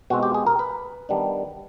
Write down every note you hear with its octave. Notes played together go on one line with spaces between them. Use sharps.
B2 G#3 C4 F#4
G4
G#4
A#4
B4
D#3 G3 B3 D4